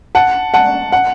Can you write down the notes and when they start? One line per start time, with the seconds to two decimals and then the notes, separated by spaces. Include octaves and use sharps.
0.15 F#5 A5
0.54 F#5 A5
0.92 F#5